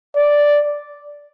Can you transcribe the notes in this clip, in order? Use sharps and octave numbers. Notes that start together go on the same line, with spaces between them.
D5